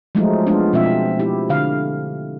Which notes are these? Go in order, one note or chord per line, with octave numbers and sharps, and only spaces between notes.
F3 F#3 G#3 A3 D#4 F4
G#3 B3 D4 F4
B2 F3 C4 F4 E5
E4 G4
D3 F5